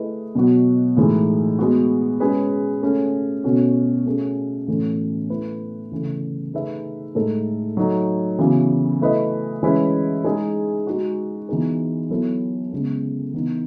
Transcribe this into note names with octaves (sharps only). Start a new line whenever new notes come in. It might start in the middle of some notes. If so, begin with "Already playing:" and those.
Already playing: A3 E4 G#4 B4 D#5
B2 F#3 B3 F#4
A2 E3 G#3 D#4
G#3 B3 F#4
G#3 C#4 G#4 B4
A3 C#4 G#4
B2 A3 C#4 F#4
A3 C#4 G#4
A2 E3 A3 C#4
A3 E4 B4
C#3 E3 A3
A3 D#4 G#4 B4 E5
A2 G#3 D#4 A4
F#3 A3 D#4
C#3 E3 B3 F#4
A3 E4 B4 D#5
E3 G#3 C#4 E4 B4
G#3 D#4 G#4
G#3 D#4 F#4
E3 B3 D#4 G#4
F#3 B3 E4 A4
C#3 G#3 B3
E3 B3 D#4